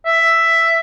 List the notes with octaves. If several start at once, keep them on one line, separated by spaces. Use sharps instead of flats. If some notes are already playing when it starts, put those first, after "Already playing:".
E5